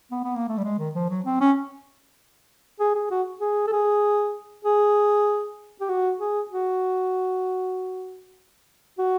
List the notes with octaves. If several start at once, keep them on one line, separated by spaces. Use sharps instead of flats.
B3
B3
A#3
A3
G3
G#3
D#3
F3
F#3
C4
C#4
G#4
G#4
F#4
G#4
A4
G#4
G#4
G4
F#4
G#4
F#4
F#4